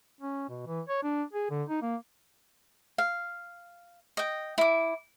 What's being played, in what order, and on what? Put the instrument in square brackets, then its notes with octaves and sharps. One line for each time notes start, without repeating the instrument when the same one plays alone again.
[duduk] C#4
B2
E3
C#5
D4
G#4
D3
D#4
A#3
[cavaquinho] F5
D#5 G5
E4 D6